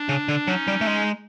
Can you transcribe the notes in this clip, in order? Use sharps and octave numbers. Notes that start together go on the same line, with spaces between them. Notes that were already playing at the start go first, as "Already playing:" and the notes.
Already playing: D4
C#3
D3
F#3 C#4 D#4
G3
A3
G#3